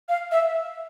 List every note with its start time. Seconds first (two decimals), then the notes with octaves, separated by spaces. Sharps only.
0.09 F5
0.32 E5